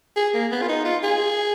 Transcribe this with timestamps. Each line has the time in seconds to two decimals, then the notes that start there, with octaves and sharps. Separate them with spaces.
0.16 G#4
0.34 A#3
0.52 B3
0.62 F4
0.68 D#4
0.85 F4
1.03 G#4